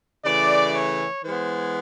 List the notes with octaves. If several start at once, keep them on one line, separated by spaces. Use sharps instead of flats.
C#3 E3 A3 D5
C#5
E3 G#3 B3 C5